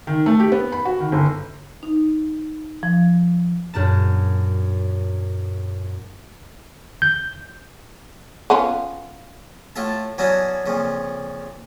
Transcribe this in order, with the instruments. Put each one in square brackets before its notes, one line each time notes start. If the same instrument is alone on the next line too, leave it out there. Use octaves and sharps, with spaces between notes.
[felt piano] D#3
A3
G4
B3
B5
F#4
D#3
G1
[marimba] D#4
F3
[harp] F#2 A#2 D4 A5
[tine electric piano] G6
[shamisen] B3 C#4 F4
[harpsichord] A2 F4 A4 E5 A5
E3 F#3 B3 C#4 D4 F#4
F2 A#2 C#3